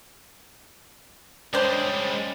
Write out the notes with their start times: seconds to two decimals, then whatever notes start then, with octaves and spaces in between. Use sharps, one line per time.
1.54 G3 G#3 C#4 D4 C5